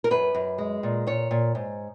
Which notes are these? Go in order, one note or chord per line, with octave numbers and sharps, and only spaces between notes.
A#4
F#2 B4
F#2
G#3
A#2
A#2 C#5
A#2
G#2